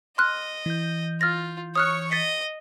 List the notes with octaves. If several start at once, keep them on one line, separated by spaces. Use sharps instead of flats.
D#5 C6 F6 F#6
E3 G6
F4 F6 A6 A#6
C#5 C#6 D#6 F6 F#6
D#5 A6 B6 C#7